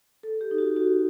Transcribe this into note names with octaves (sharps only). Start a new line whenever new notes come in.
A4
G4
D#4
F#4
F#4